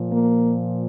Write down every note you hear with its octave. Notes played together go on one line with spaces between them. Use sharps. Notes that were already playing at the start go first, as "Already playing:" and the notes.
Already playing: A#2 F3
A#3